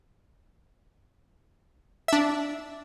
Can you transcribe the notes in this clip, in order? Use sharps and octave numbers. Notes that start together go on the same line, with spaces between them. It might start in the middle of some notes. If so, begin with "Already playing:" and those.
D4 E5